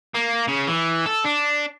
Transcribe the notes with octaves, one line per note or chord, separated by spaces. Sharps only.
A#3
C#3
E3
A4
D4